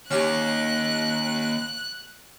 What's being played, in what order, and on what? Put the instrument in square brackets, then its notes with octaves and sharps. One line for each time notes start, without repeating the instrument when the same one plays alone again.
[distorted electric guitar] D#2 [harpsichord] C#4 G4 G#5 [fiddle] F#6